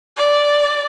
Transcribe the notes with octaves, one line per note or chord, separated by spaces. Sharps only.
D5